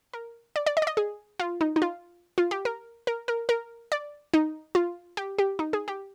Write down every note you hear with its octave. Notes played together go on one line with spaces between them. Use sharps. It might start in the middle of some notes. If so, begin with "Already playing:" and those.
A#4
D5
D5
D#5
D5
D#5
G#4
F4
D#4
D#4
F4
F4
G4
A#4
A#4
A#4
A#4
D5
D#4
F4
G4
G4
D#4
G#4
G4